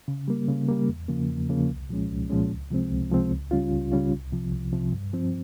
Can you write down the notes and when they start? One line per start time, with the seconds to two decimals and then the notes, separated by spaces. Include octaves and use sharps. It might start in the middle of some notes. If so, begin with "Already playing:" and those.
0.08 C#3
0.28 G3 A#3
0.48 C#3
0.69 G3 A#3
0.89 E2
1.08 C#3 F3 A#3
1.29 E2
1.49 C#3 F3 A#3
1.70 C2
1.89 A#2 F3 G#3 C#4
2.11 C2
2.30 A#2 F3 G#3 C#4
2.50 C#2
2.71 C3 F3 G#3 C4
2.91 C#2
3.11 C3 F3 G#3 C4
3.31 C#2
3.51 C#3 G3 C#4 F4
3.72 C#2
3.92 C#3 G3 C#4 F4
4.12 C2
4.33 C3 F3
4.52 C2
4.73 C3 F3
4.93 G2
5.13 F3 C4